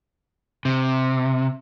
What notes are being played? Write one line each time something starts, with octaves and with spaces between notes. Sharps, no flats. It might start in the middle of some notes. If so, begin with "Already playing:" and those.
C3